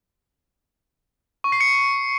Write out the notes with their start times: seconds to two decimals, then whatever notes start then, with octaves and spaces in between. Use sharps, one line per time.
1.44 C#6
1.52 C7
1.60 C#7